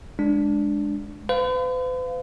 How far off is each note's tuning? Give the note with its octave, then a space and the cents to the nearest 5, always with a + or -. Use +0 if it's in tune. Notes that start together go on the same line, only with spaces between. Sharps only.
G#3 +0 D4 +0
B4 +45 F5 +0